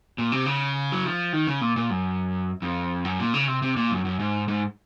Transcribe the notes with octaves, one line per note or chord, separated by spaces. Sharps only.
A#2
C3
C#3
F#3
F3
D#3
C#3
A#2
A#2
F#2
F2
F#2
A#2
C#3
C3
C3
A#2
F#2
F#2
G#2
G#2